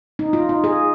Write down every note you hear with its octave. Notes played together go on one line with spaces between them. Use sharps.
D#4
F4
D#4
G#4